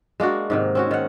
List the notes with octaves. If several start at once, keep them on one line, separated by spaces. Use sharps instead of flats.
G#3 A#3 D4 F#4
G#2 C3 D#3
C4 C#4 F#4
D#3 F#5